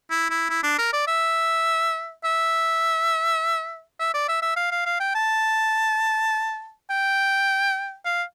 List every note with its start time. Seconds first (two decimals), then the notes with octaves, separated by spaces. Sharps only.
0.10 E4
0.30 E4
0.50 E4
0.63 D4
0.78 A#4
0.93 D5
1.08 E5
2.24 E5
3.99 E5
4.14 D5
4.28 E5
4.42 E5
4.56 F5
4.71 F5
4.86 F5
5.00 G5
5.15 A5
6.90 G5
8.06 F5